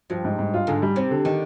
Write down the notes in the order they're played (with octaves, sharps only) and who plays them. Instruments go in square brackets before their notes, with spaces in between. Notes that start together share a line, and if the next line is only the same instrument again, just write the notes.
[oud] G2 [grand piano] F3
[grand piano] G#2
G#2
F4
[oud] G#2 [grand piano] D3
[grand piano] G3
[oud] C3 [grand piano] C4
[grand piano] D3
[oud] D3 [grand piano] D#3